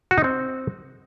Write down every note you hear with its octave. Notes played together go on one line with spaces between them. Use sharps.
F#4
D#4
C4